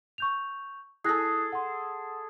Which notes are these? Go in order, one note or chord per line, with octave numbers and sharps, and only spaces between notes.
C#6 G6 F7
E4 G#4 A4 F#6 A#6
F#5 C6